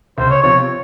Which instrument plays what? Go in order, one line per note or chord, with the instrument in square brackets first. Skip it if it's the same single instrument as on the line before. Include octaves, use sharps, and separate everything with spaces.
[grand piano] C#2 [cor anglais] C5
[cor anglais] C#5
[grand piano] C3 F3 C4 F4 [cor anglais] C#5